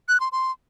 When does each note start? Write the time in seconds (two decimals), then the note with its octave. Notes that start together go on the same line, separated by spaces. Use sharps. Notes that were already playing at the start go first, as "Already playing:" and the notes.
0.08 F#6
0.20 C6
0.32 C6